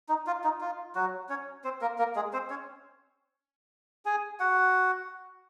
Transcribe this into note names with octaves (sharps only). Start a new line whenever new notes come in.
D#4
F4
D#4
F4
F#3 F#4
C#4 C#5
C4 C5
A#3 A#4
A#3 A#4
G#3 G#4
C4 C5
C#4 C#5
G#4 G#5
F#4 F#5